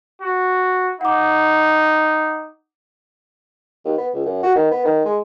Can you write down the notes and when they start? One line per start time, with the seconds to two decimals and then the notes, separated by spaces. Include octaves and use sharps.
0.21 F#4
1.01 D#4 F#5 D6
3.85 D#2
3.98 B3
4.14 C#2
4.25 F#2
4.43 F#4
4.55 D#3
4.71 B3
4.85 D#3
5.05 G#3